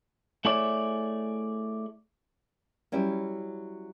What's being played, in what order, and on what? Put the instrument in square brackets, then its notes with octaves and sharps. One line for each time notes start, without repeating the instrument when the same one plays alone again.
[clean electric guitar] A3 E4 G#4 C#5 D5
[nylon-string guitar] F#3 G3 C#4 E4